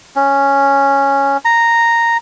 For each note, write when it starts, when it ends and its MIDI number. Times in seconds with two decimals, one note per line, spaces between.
0.16 1.37 61
1.45 2.17 82